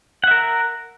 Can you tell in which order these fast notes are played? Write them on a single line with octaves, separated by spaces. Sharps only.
F#5 E5 A#4